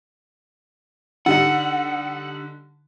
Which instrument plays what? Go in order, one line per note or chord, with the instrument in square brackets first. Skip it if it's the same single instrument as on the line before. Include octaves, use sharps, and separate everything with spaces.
[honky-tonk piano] D3 G3 D#4 [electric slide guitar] F#5